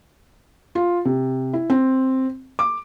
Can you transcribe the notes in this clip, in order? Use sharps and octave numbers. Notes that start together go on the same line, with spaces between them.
F4
C3
E4
C4
D6